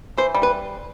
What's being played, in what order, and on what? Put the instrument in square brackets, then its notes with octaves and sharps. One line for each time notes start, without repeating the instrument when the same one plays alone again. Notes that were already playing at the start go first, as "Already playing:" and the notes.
[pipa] E3 [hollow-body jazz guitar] C5
[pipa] G3
[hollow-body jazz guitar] B4